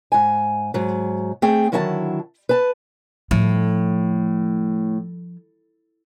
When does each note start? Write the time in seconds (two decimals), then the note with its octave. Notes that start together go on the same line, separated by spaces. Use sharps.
0.12 G#2 G#5
0.74 G#2 F#3
1.42 A3 C4 G#4 G5
1.72 D3 D#3 F#3 E4 F#5 A5
2.49 B4 A5
3.31 A2 F3